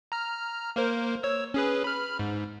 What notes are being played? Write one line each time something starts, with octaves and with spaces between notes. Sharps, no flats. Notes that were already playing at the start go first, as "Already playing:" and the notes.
A#5 F6
A#3 A#4 C5
C#5 E6
C#4 G#4 B4
B5 F6
G#2